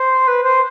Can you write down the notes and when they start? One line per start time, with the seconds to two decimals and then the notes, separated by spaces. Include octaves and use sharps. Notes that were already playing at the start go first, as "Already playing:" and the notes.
Already playing: C5
0.27 B4
0.43 C5